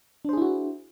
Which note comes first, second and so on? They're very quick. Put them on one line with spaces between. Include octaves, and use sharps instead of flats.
D4 C5 G#4 E4 F#4